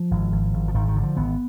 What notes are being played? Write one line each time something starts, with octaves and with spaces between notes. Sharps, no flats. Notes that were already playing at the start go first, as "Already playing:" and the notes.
Already playing: F3
G#1
G#1
G#1
F3
G#1 D#3
D#3
D3
F3
G#1 B3